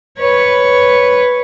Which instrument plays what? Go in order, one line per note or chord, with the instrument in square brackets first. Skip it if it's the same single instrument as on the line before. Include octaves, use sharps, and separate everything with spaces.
[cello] B4 C#5